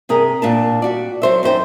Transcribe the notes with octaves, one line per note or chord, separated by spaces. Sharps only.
G2 C3 G#4 A#4
A#2 D4 A5
G3 F#4 D5
F#3 C5 E5
F#2 D#4 C5 G5